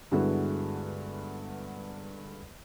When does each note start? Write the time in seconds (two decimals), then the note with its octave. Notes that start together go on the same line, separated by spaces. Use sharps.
0.12 G2 D3 G#3 B3 E4 F#4